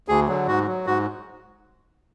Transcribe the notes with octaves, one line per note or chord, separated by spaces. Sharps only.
D2 G#4
D3 F#3
G#2 F#4
F#3
G#2 F#4